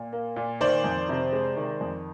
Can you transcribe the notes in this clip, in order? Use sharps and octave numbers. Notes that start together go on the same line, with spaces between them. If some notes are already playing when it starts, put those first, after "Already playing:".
Already playing: A#2
A#3
A#2
D#3 C5 D5
F2
C3
G#3
D#3
F2